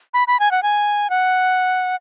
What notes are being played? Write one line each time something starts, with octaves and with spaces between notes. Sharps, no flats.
B5
B5
G#5
F#5
G#5
F#5